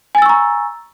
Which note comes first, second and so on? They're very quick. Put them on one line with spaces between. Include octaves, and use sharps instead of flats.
G#5 A6 E6 C#6 A#5